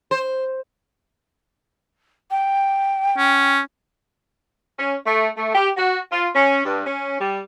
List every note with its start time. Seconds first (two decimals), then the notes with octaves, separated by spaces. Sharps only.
0.11 C5
2.31 G5
3.18 C#4
4.79 C#4
5.07 A3
5.37 A3
5.55 G4
5.77 F#4
6.12 F4
6.35 C#4
6.65 G2
6.86 C#4
7.21 G3